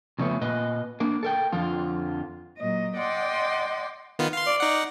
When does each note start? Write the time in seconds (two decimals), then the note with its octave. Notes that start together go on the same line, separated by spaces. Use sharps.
0.19 F2 C#3 F3 A3 B3
0.41 A#2 B4 D#5
1.00 A#3 D4 A#4
1.23 A4 A#4 G5
1.52 F2 D3 F3 F4
2.58 A#2 F#3 D#5
2.97 D5 D#5 F#5 G5 C6 D6
4.19 D#3 B3 F4
4.33 F5 C6
4.47 D5
4.60 D#4 F#5